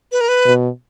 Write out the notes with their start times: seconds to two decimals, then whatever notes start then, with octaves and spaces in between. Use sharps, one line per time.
0.12 B4
0.21 A#4
0.28 B4
0.45 B2